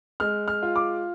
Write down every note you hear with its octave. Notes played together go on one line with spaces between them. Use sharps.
G#3 F6
F6
F4
D6